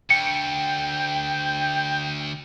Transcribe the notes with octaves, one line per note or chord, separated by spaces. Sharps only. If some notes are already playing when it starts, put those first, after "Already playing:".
D2 G5 C#7